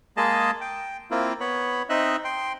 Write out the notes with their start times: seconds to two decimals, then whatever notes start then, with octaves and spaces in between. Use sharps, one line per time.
0.17 G#3 A#3 G#4 D#5 A5
0.61 G5
1.11 A#3 C4 E4 F4
1.40 B3 C#5 B5
1.89 C4 D#4 D#5 E5 F#6
2.24 G5 C6